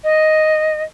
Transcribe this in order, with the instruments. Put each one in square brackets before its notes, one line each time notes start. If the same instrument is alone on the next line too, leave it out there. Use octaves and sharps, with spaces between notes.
[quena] D#5